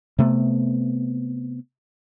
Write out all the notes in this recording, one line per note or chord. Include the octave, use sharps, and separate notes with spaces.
C3 A3 B3